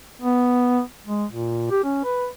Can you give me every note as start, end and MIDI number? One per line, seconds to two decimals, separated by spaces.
0.22 0.81 59
1.06 1.25 56
1.31 1.66 46
1.71 1.83 67
1.84 2.01 61
2.04 2.27 71